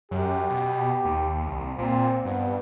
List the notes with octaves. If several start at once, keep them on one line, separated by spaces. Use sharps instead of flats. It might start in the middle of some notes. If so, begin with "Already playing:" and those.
F#2 G4
B2
D#2
C2
A#2 C4
G2 B3